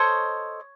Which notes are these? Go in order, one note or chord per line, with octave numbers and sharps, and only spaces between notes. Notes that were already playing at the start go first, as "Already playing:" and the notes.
Already playing: A4 C5 C#5 D#5 C#6